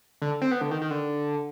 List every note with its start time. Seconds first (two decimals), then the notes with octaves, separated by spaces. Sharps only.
0.22 D3
0.41 C4
0.51 B3
0.61 D3
0.71 D#3
0.81 D#3
0.91 D3